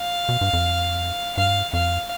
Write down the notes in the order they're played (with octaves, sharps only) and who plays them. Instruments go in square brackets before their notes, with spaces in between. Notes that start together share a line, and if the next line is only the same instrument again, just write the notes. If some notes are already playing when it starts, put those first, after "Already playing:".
Already playing: [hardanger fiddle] F5
[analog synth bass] B2
G2
F2
[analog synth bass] G2 [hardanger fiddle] F5
[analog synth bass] F2 [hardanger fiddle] F5